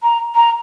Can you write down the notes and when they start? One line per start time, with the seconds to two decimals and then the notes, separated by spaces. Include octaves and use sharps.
0.03 A#5
0.35 A#5